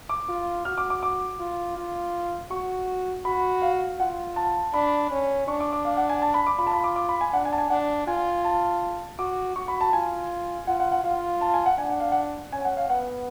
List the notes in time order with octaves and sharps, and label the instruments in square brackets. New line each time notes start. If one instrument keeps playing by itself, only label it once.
[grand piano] D6
[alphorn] F4
[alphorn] F#4 [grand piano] F6
[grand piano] D6
D6
D6
[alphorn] F4
F4
[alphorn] F#4 [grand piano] C#6
[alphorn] F#4 [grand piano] B5
[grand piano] F5
[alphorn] F4 [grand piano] F#5
[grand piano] A5
[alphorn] D4 [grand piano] B5
[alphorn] C#4
[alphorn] D4 [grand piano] C#6
[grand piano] D6
D6
F5
F#5
G#5
A5
B5
D6
[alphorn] F4 [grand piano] B5
[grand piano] A5
B5
D6
D6
B5
G#5
[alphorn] D4 [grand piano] F#5
[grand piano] G#5
A5
G#5
[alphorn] D4 [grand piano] F#5
[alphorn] F4 [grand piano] G#5
[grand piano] A5
[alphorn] F#4 [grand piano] D6
[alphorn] F#4 [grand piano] C#6
[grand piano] B5
A5
[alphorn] F4 [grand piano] G#5
[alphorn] F4 [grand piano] F#5
[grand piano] F#5
F#5
[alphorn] F4 [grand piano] F5
[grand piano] A5
G#5
F#5
[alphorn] D4 [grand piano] G#5
[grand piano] F#5
F5
F#5
[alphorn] C#4 [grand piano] G#5
[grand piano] F#5
F5
[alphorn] B3 [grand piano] F#5